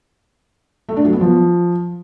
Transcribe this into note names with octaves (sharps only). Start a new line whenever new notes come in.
A3
D4
F#3
B3
F3